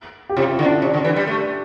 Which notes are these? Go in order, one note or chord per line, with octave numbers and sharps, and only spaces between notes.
G4
C3 F4
E4
D3
D4
C3
D3
E3
G3
A3